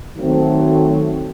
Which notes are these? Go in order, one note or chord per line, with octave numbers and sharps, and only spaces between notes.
D#3 F#3 A3 C4